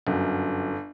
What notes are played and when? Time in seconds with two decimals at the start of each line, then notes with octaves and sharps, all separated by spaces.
0.07 G1 F#2